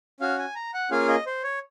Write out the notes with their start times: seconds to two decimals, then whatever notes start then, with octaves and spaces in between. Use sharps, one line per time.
0.20 C#4 F#4 F5
0.38 G#5
0.55 A#5
0.74 F#5
0.91 A#3 C#4 F4 G#4 F5
1.08 D#5
1.27 C5
1.43 C#5